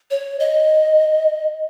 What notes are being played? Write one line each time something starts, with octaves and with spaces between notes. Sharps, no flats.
C#5
D#5